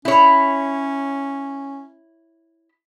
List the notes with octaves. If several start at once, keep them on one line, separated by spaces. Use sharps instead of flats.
C#4 E4 C#5